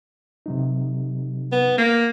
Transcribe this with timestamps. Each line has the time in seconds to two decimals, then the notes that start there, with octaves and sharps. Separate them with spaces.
0.46 C3 F#3 D#4
1.52 B3
1.78 A#3